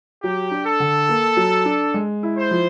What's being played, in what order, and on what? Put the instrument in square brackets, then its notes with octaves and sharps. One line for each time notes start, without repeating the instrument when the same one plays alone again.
[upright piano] F#3 [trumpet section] G4
[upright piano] D4
[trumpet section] A4
[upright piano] D3
A#3
F#3
D4
G#3
E4
[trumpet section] C5
[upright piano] F3